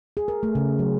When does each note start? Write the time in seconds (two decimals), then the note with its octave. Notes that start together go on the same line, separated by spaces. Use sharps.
0.17 G#4
0.28 A#4
0.43 A3
0.55 C#3
0.79 F#3